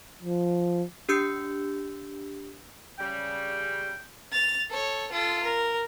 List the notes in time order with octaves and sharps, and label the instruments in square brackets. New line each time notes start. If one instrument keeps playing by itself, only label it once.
[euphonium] F3
[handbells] D4 G4 E6 G6 C#7
[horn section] C#3 G3 [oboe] G5
[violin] A6 F7
A4 C#5
F4 A4
A#4